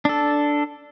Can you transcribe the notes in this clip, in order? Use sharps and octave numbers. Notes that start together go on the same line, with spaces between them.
D4 A4